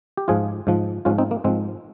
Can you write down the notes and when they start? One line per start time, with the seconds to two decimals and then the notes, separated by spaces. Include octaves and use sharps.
0.17 G4
0.28 G#2 F3 F4 G#4
0.67 G#2 F3
1.05 G#2 C#4 F4
1.10 F3
1.18 C4 D#4
1.31 A#3
1.44 G#2 F3 G#3 C4